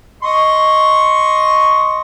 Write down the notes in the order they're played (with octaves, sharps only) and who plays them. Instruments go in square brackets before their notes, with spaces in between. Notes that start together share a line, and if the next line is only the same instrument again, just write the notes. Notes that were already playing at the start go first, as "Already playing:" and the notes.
[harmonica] D#5 C6 C#6